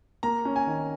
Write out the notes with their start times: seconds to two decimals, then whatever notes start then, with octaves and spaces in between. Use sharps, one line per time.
0.23 A#3 A#5
0.45 C#4
0.56 G#5
0.67 D#3